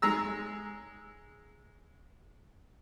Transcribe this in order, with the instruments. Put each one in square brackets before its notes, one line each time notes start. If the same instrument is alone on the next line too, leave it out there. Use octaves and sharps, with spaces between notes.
[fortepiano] G#3 A#5 E6